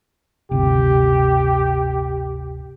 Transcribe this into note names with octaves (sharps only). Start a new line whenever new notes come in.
D1 G1 C3 G4